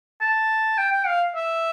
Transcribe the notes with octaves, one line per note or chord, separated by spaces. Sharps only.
A5
G5
G5
F5
E5